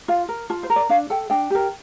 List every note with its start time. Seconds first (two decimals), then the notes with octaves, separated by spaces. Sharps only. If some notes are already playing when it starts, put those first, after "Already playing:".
0.08 F4 F5
0.28 A#4
0.50 F4 A5
0.63 C5
0.70 A#4
0.76 D5
0.89 D4 F5
1.10 A4 G5
1.30 D4 G5
1.50 G4 A#4